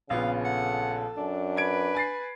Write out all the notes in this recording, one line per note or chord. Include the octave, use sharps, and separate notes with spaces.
A#1 C#3 B3 F4 F5
A4 F#5
F#2 D4
B4 G#6 D7
G#5 A6 C7